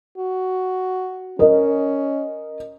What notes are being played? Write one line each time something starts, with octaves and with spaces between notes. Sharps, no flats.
F#4
C#4 A#4 D#5